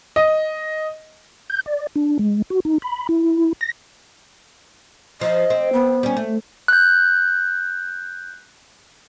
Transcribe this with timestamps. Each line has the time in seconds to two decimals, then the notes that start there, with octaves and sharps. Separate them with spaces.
0.16 D#5
1.50 G6
1.66 D5
1.96 D4
2.19 G#3
2.50 F#4
2.65 D#4
2.82 B5
3.09 E4
3.61 A#6
5.21 F3 D#5
5.50 C4
5.73 B3
6.03 G3 C#4
6.17 A3
6.68 F#6 G6